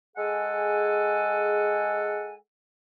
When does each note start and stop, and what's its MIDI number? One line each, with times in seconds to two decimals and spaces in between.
0.16 2.34 56
0.16 2.34 68
0.16 2.34 69
0.16 2.34 78
0.16 2.34 80